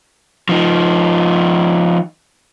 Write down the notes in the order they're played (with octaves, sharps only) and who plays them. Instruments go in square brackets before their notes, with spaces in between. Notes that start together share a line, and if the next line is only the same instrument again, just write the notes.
[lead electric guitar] F3 D#4